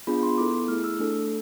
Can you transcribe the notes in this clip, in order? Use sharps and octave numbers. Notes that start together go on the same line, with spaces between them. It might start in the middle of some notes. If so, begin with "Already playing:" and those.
B3 D4 F4 G#4 B5
C6
B3 E4 A4 D6
A3 E4 G#4 F6
E6
A3 D4 A4